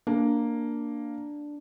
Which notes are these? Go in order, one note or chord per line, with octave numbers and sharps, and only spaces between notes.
A#3 D4